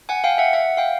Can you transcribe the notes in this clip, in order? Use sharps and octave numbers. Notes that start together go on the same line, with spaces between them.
F#5 G#5
F5 G5
E5 F#5
E5 F#5
F5 G5